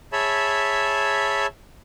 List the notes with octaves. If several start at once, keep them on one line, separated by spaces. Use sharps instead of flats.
G#4 C#5 E5 A5 B5